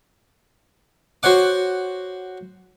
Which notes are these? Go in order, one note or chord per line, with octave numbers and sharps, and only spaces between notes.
F#4 C5 C#5 F#5 D6